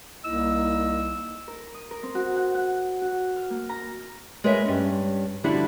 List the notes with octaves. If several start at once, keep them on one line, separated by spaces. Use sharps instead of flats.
C2 A#3 D#4 E4 D#5 E6
A#4
D#6
A#4
C4
F#4
F#5
F#5
F#4
F6
A#3
A#5
G#3 A#4 B4 C#5 D#5 E5
G2 C#4
D3 F3 G3 D4 E4 F#4